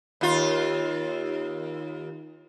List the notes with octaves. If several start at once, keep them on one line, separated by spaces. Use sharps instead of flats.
D#2 F4